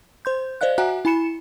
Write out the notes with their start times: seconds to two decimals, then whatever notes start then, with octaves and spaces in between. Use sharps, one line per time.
0.25 C5 C6 G6
0.61 C5 D5 D#5 F5 F#6
0.78 F#4 E5 F#5 G#5 A#5 F#6
1.05 E4 G#5 B5 C#7 E7